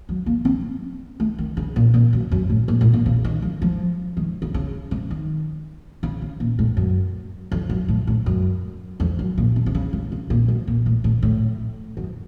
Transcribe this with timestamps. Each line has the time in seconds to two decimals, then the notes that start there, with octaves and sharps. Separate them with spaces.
0.09 F#3
0.26 A#3
0.45 C4
1.20 A3
1.38 D#3
1.57 C#3
1.76 A#2
1.94 A#2
2.13 F#2
2.31 F#2
2.49 A2
2.68 A#2
2.81 A2
2.93 A#2
3.06 C#3
3.24 D#3
3.42 F3
3.62 F3
4.17 D#3
4.42 C#3
4.54 C#3
4.91 C3
5.10 D#3
6.03 C#3
6.22 C#3
6.40 A#2
6.59 A2
6.77 F#2
7.52 F2
7.70 F#2
7.88 A2
8.07 A2
8.26 F#2
9.00 F2
9.19 F#2
9.38 A#2
9.56 C3
9.66 C3
9.75 C#3
9.93 C#3
10.12 C3
10.30 A#2
10.48 F#2
10.67 A#2
10.86 A2
11.04 A2
11.22 A2
11.97 F#2